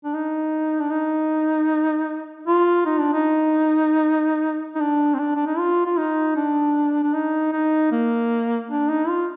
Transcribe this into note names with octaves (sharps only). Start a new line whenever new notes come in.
D4
D#4
D4
D#4
F4
D#4
D4
D#4
D#4
D4
C4
D4
D4
D#4
F4
F4
D#4
D4
D4
D#4
D#4
A#3
D4
D#4
F4